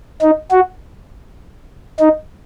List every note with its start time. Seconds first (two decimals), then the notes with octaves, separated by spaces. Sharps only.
0.22 D#4
0.51 F#4
1.99 D#4